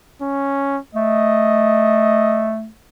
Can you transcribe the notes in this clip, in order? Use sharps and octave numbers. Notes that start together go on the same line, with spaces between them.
C#4
A3 D#5